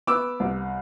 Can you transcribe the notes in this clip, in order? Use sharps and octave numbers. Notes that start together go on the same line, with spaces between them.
B3 D6 E6
C2